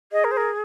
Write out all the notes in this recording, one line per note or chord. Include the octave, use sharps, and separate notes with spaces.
G#4 D#5
A#4
C5
A#4